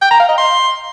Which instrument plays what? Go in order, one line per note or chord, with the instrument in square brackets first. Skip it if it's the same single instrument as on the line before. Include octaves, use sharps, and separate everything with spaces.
[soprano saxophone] G5
A#5
F5
D#5
C6